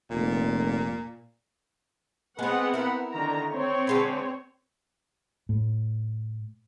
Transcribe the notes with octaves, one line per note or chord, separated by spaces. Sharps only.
F1 A#2
G#3 B3 C4 G#4 F#5
E4 A#4
D3 D#3 A#5
C4 C#5
D3 G#3 B4
A2